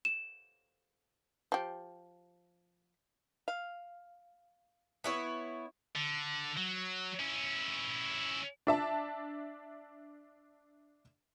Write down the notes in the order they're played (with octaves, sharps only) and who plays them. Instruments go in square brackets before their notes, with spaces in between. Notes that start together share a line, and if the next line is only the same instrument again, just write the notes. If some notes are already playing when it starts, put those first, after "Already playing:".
[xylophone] E7
[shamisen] F3 G4
[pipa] F5
[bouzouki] B3 E4 C#5
[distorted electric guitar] D3
F#3
C#4 E4
[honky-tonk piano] D4 E5 A5